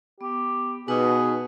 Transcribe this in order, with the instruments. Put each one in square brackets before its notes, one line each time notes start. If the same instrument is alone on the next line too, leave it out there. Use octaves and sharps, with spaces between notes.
[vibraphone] B3 [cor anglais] G4
[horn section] B2 [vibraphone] D#4 B4 [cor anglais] G#4